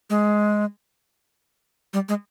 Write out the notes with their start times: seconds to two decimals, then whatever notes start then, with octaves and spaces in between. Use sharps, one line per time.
0.10 G#3
1.93 G3
2.09 G#3